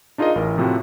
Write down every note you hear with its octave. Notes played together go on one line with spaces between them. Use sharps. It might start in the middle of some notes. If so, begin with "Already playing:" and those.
D4 D#4 F4 G#4 A#4 D#5
A1 E4 A#4
A2 C3 F3 C4 E4 F#4